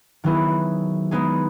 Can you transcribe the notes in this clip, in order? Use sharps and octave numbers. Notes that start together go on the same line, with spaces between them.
D#3 F#3 B3 E4 G#4
G#3 B3 D#4 G#4